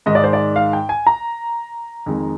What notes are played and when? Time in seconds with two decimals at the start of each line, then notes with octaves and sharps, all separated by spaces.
0.06 G#2 D#3 G#3 D#5
0.15 D5
0.24 C5
0.33 D5
0.56 F5
0.73 G5
0.89 G#5
1.07 A#5
2.06 F2 D#3 G#3